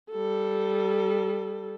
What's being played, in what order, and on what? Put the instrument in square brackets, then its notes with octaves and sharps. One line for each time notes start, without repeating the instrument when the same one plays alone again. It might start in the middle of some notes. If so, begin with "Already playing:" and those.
[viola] G3 A4